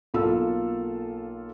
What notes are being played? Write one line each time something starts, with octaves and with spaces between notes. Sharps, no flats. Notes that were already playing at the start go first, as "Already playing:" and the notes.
B1 A#3 F4 A4 E6